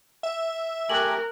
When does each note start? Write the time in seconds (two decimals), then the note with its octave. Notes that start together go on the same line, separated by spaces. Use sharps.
0.23 E5
0.90 A3 G4 A#4 G#5 F#6 F#7